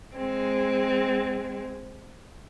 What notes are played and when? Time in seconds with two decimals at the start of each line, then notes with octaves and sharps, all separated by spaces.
0.14 G#3 C4